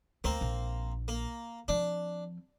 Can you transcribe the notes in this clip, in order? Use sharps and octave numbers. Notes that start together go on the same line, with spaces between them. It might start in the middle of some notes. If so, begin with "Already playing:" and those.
D2 A#3 C4
A#1
A#3
F3 C4 D4